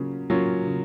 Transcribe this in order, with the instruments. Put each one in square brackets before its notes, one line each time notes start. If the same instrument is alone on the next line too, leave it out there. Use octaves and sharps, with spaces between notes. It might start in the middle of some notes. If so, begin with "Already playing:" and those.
Already playing: [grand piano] C#3 F#3 A#3 C#4 F4
F#3 A#3 C#4 F4
C#3